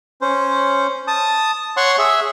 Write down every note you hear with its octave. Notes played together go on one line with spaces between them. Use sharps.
C#4 C5
A5 D#6
C#5 F#5 C6 C#6
G#4 E5